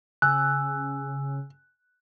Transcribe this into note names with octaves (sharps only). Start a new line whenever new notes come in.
C#3 G#5 E6 F#6